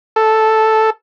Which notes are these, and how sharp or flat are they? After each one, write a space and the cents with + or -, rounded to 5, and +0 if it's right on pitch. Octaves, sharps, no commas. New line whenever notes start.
A4 -5